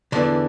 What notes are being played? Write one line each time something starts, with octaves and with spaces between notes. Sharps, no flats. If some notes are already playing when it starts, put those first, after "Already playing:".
E2 D3 E3 D4